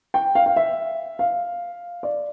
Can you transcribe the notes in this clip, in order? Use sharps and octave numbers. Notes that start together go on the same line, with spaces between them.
G5
F5
F5
E5
F5
D5